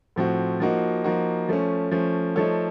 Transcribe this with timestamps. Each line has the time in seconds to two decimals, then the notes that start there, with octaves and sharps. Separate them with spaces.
0.16 A2 F3 C4 F#4
0.60 F3 A#3 D#4 F#4
1.04 F3 A#3 D#4 F#4
1.49 F3 A3 C#4
1.91 F3 A3 C#4
2.36 F3 A3 D#4 A4 C#5